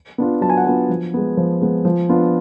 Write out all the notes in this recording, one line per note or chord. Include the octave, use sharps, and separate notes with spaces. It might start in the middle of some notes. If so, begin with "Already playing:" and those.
B3 D4 F4
F#3 A5
G#5
F#5
B3 D4 F4 G#5
F3
G#3 B3
F3
G#3 B3
F3
B3 D4 F4